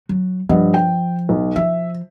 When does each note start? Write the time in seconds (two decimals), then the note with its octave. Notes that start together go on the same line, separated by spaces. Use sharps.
0.09 F#3
0.49 G2 F3 D#5 F#5
0.74 G5
1.29 B1
1.56 F3 E5